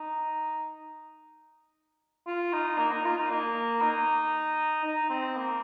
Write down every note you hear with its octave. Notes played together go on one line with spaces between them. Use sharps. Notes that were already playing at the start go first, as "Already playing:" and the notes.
Already playing: D#4
F4
D#4
A#3
D#4
F4
D#4
A#3
D#4
D#4
C4
A#3